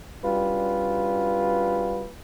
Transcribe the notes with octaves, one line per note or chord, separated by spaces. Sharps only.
G3 C#4 D4 F4 F#4 B4